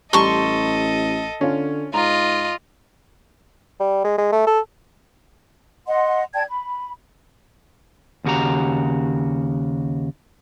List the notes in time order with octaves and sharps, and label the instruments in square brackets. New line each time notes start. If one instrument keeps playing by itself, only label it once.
[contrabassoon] A1 [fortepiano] G3 A5 A#5 [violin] A4 D#5 [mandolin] C6 C#6
[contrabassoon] D3 [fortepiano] C#4 F4
[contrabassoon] G#2 [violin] F4 D#5 [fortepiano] A#5
[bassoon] G3
G#3
G#3
A3
A4
[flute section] D#5 F#5 C6
D5 G5 A5 G#6
B5
[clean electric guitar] D#2 C#3 F#4 G4 A#5